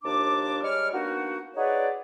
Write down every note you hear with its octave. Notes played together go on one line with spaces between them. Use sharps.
D#2 F3 D4 A5 D6
G3 G#3 C#5 D5 F6
A#3 B3 D4 D#4 F#4
D#4 F#4 G#4 B4 C#5 D5